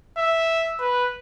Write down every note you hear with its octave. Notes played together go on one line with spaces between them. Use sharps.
E5
B4